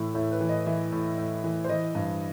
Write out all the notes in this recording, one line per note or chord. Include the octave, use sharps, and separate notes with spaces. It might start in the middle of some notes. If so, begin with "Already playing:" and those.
Already playing: A2 E3 E4
A2 E4
B4
E3
D#5
E3 E5
A2
A2
E3
C5
E3 D#5
G2